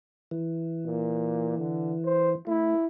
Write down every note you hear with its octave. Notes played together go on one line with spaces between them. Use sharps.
E3
A#2
D3
C5
A3 E4